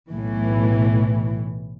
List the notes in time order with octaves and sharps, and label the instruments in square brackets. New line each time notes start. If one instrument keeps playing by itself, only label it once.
[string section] B1 A2 E3